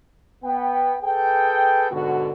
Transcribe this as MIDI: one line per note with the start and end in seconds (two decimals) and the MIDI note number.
0.43 0.96 59
0.43 0.96 79
1.02 1.86 68
1.02 1.86 69
1.02 1.86 71
1.02 1.86 79
1.90 2.31 44
1.90 2.31 47
1.90 2.31 50
1.90 2.31 66